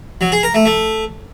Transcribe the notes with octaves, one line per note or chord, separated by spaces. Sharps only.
F#3
G#4
A#4
A3
A3